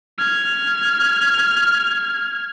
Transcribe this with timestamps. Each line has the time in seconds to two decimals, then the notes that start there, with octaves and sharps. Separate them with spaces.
0.18 F6 G#6